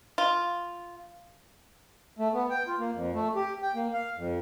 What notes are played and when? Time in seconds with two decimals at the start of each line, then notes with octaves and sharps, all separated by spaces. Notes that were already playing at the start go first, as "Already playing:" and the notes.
0.18 F4
2.19 A3
2.34 B3
2.50 G5
2.67 F4
2.79 A#3
2.94 F2
3.15 A3
3.36 G4
3.63 G5
3.75 A#3
3.94 F5
4.17 F2